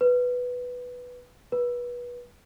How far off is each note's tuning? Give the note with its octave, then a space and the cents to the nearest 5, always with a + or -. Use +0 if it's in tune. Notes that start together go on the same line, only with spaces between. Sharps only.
B4 +0
B4 -25